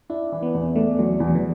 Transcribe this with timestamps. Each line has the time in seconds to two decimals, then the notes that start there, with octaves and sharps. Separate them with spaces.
0.10 D4 E4
0.32 E3
0.43 B3
0.54 E2
0.76 A3 D4
0.98 E2 F#3
1.20 E2 E3
1.28 F#3
1.35 E3